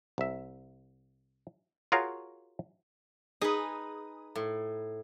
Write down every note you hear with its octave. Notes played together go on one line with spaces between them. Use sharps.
C2 E5
F4 F#4 G#4 A#4 C#5 F5
D#4 G#4 B4 D#6
A2